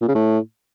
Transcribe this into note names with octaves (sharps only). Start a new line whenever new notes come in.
A#2
C#3
A2